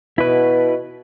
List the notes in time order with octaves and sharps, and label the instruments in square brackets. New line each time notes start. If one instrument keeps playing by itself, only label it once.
[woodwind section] B2 [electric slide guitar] E4 B4